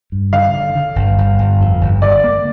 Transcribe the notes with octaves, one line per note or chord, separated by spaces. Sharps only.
G2
D3 F5
D3
D3
G1
G1
G1
F2
G1
D3 D5
A#3